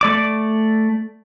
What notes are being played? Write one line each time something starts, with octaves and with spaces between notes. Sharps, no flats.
A3 D5 D6